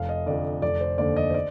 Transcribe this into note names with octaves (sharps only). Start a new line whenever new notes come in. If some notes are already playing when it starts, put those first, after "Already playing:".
Already playing: F1 F5
D#5
F2 D3 D5
F1 D5
C5
D#2 D3 D5
D#5
C5
D5